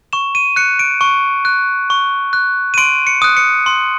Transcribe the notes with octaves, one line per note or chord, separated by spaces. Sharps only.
C#6 E7
D#7
F#6 C#7
D7
C#6
F#6
C#6
F#6
D#7
C6 D7
C#7
D#6 F#6
C#7
C6